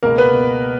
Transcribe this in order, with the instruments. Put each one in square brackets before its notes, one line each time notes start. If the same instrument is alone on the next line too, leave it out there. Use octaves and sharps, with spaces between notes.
[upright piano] C#2 B2 A#3 A#4
B3 B4
B2